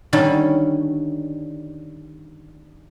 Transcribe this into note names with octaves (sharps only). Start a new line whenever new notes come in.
D3 D#3 G3 C#4